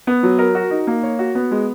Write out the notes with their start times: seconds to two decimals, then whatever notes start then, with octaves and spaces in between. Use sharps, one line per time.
0.07 B3
0.23 F#3
0.39 A#4
0.55 F#4
0.71 D#4
0.87 A#3
1.03 C#5
1.19 F#4
1.35 B3
1.51 G#3